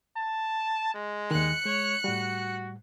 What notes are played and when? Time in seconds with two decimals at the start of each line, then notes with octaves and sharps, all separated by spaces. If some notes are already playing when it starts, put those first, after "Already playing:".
0.17 A5
0.94 G#3
1.31 D#2 D#3 F#6 C#7
1.65 G#3 C#5
2.04 A2 G3 F#4